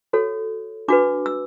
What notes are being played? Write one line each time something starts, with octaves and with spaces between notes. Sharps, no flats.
F#4 A4 C#5
D4 F#4 B4 D6
E6